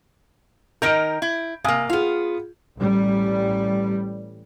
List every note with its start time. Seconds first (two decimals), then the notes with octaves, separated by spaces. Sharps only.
0.82 D#3 D#4 A#4 G6 D7
1.22 E4
1.64 C3 A#3 F5 G#5 D#6
1.89 B3 F4 G#4 F5
2.76 A1 G3